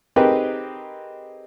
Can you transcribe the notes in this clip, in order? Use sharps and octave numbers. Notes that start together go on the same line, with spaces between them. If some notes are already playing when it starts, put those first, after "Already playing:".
C4 D#4 G4 G#4 A#4 B4